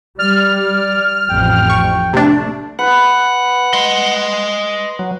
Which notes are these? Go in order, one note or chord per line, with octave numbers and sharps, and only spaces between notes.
G3 D5 F6
A1 F2 G5
C#6
C3 A3 D4
B4 F#5
D#5 C6
F#3